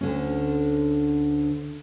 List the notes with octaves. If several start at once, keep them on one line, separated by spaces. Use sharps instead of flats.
D2 D3 C#4